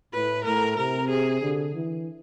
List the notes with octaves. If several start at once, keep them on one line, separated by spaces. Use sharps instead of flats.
A2 B4
A2 A#4
C3 A#4
G#4
D3
E3